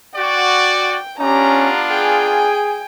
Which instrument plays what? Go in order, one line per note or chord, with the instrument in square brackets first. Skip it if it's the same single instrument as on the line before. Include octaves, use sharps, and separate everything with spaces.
[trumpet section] F#4 D5 [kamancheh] G5
[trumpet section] B3 D4 F4 [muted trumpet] C#4 [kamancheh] G4 A#5
[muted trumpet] G#4 [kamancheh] G5 G#5